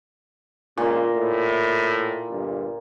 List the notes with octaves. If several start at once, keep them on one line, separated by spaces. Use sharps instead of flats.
C#2 A#2
A2
G1